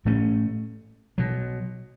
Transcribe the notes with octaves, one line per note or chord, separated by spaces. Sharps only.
A2 A3 C#4
B2 F#3